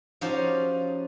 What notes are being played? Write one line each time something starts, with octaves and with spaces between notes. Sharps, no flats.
F3 C#4 D#4 F#4 G4 C5